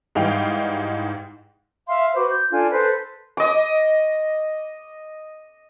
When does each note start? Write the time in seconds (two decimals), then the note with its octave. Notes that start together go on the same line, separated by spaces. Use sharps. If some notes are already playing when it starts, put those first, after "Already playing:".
0.15 G#2 E3 G3 D#4 F5 G5
1.88 E5 F5 C6
2.15 F#4 B4 C5 D6
2.29 G6
2.51 D4 F4 A4 G#5
2.71 A4 B4 C5
3.37 D#5 D6